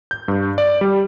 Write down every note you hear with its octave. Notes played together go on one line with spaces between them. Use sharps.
G6
G2
D5
G3